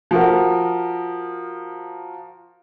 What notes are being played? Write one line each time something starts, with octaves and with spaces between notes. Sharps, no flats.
F3 F#4 A#4